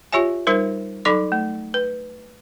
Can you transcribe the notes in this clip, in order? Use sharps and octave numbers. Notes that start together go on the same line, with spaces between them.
F4 G4 C#5 E5 G#5
G3 D#4 A#4 C5
F#3 D#4 A4 B5 D6
A3
B4